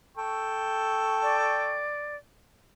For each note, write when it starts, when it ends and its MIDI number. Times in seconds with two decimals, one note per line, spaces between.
0.17 1.87 69
0.17 1.87 79
0.17 1.87 85
1.23 2.16 74